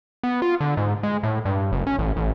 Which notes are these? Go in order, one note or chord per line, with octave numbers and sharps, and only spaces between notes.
B3
F4
D3
G#2
G#3
A2
G2
F#1
C#4
A1
A1